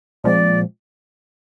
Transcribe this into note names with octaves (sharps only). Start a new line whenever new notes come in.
A#2 F3 G#3 C4 D5